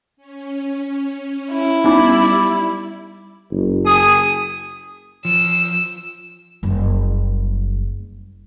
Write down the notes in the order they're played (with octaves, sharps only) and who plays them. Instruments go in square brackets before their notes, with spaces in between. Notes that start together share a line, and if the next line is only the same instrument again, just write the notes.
[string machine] C#4
[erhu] E4
[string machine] G3 [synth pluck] B3 C#4 D#4 [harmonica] D5 B5
[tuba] F#1
[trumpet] G#4 [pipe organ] D#6
[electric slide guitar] F3 [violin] E6
[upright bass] F#1 G3